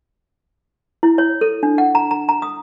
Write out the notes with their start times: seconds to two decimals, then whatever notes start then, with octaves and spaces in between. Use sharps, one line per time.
1.03 E4
1.18 C#5
1.41 A4
1.63 D4
1.78 F#5
1.95 A#5
2.11 A#5
2.29 A#5
2.42 D#6